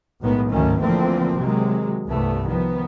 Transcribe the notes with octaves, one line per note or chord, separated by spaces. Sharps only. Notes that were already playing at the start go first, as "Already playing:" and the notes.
B1 A2 D#3 G#3 B3
D2 G#2 D#3 F#3 A3 C#4
D3 E3 F3 A3 A#3 C4
C3 D#3 F#3 G#3
C2 G2 A3 B3
D#3 F3 B3